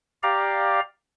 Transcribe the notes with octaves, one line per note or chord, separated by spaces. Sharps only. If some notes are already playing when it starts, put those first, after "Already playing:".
G4 D5 F5 A#5